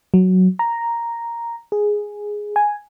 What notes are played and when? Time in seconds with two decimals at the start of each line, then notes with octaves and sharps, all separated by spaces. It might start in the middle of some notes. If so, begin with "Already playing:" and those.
0.14 F#3
0.59 A#5
1.72 G#4
2.56 G#5